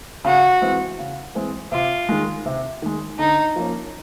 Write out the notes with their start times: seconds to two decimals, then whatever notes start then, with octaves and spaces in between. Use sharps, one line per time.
0.25 C#3 F#4
0.62 E3 G#3 C4
0.99 C#3
1.35 E3 G#3 C4
1.72 C3 F4
2.09 D#3 G#3
2.46 C3
2.82 D#3 G#3
3.19 D3 D#4
3.56 F3 A#3 C#4